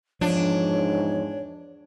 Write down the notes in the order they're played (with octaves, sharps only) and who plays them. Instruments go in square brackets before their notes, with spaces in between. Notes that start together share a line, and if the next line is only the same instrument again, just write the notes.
[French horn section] E2 G#2 [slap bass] F3 [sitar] D4 [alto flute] C#5